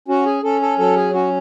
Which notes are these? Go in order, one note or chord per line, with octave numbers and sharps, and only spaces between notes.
C#4 F#4
G#4
C#4 A4
A4
F#3 A4
G#4
C#4 F#4